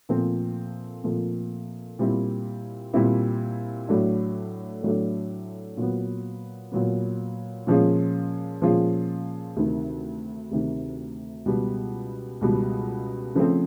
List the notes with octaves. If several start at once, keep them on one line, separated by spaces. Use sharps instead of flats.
A#2 F3 A3 C4
A#2 F3 A3 C4
A#2 G3 C4 E4
A#2 G3 C4 E4
A2 F#3 A3 D4
A2 F#3 A3 D4
A#2 F#3 B3
A#2 F#3 B3
A#2 F3 G#3 C#4 F4
A#2 F3 G#3 C#4 F4
D2 C3 D#3
D2 C3 D#3
C#2 B2 G3 B3
C#2 B2 G3 B3
C#3 F3 A3 C4